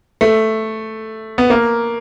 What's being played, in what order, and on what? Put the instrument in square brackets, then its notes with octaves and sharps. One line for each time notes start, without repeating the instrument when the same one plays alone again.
[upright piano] A3
B3
A#3